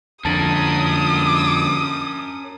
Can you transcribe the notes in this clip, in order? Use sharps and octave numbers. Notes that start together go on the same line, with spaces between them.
F2 D3 C#4 A#4 A5 D#6 A6 F#7